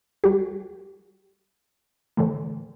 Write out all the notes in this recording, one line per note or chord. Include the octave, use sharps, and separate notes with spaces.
G3 F#4 G4
A2 D3 E3 A3